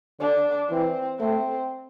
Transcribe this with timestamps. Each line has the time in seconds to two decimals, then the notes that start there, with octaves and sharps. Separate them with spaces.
0.20 D3 D4
0.70 E3 C4
1.19 A3 C4